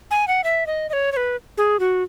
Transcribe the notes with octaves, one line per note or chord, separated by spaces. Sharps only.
G#5
F#5
E5
D#5
D#5
C#5
C#5
B4
G#4
F#4